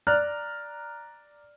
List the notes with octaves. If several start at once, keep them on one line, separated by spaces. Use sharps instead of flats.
D5 A#5 F6 F#6